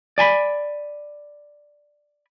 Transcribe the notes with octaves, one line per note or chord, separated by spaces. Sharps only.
D5 G#5 A5 B5